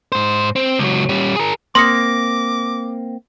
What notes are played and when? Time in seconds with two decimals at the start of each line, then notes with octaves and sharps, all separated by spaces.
0.12 G#2 C5
0.56 C4
0.79 C#2 F#3
1.09 G3 C#4
1.36 G#4 A#4
1.75 A#3 C4 C6 D6 D#6 A#6 C#7